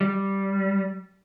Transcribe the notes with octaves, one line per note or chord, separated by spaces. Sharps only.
G3